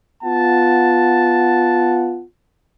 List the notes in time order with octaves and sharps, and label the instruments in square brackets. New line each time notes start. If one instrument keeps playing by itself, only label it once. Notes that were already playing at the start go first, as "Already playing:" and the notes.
[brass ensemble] B3 F4 F#5 A5